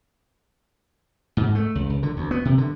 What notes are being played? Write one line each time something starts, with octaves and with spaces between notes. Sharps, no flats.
G#2
A3
C#2
C#2
D3
D2
B3
C3
D3